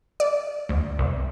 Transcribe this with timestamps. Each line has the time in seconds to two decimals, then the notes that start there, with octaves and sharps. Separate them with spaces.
0.20 D5
0.69 D2
0.99 C2